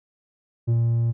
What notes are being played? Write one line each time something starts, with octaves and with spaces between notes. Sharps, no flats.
A#2